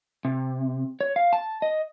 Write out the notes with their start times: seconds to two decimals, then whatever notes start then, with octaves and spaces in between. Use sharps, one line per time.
0.25 C3
1.01 C#5
1.16 F5
1.33 A5
1.62 D#5